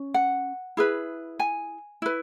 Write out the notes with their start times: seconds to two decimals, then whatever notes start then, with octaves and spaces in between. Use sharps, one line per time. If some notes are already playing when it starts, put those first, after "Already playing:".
Already playing: C#4
0.14 F#5
0.77 E4 G#4 B4
1.39 G#5
2.02 E4 B4